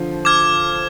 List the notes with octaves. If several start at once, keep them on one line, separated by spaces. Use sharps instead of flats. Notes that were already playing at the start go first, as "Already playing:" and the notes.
Already playing: D3 F3
D6 F6 G#6